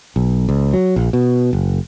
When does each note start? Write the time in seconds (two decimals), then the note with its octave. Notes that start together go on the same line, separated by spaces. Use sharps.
0.16 B1
0.49 C#2
0.73 F#3
0.96 A#1
1.13 B2
1.53 F#1